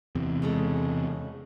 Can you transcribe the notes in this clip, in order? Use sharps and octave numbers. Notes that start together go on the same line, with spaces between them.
E2 C3
C#3 G#3 A4